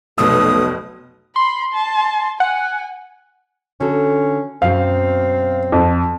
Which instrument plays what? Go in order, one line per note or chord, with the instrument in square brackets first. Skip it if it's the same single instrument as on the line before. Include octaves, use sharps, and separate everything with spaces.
[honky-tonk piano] F1 B2 E6 [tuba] B1 [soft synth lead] A3 [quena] D#6
[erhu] B5 [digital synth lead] C6
[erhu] A5
[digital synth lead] F#5 [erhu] G#5
[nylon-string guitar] D3 F#4 A4 [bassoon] C#4
[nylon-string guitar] F#2 B2 F#4 [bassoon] C4 [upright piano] F5
[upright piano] F2